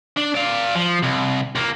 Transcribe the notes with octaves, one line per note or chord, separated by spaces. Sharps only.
D4
D5 F5
F3
C2
C#2 A#3